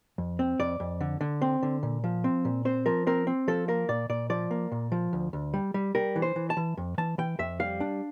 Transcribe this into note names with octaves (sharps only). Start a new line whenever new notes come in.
F2
C4
F2 D5
F2
D3
D3
C4
D3
A#2
F3
C4
A#2
C4 C5
F3 A#4
C4 A#4
C4
F3 A4
A#3 A#4
A#2 D5
A#2 D5
F3 D5
A#3
A#2
F3
D2
D2
G3
G3
G3 A#4
E3
C5
E3
A5
E3
F2
E3 A5
E3 G5
F2 E5
G3 F5
D4